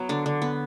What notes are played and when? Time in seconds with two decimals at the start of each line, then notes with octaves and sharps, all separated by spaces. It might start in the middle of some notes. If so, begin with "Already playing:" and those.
Already playing: F#3 B3
0.09 D3 D4
0.26 D3
0.42 B3